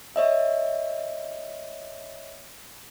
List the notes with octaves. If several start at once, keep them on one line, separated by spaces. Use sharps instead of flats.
C#5 D#5 E5